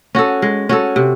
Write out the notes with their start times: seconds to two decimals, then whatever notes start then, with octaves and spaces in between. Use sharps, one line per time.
0.15 C#4 F#4 A4
0.42 G#3
0.69 C#4 F#4 A4
0.96 C3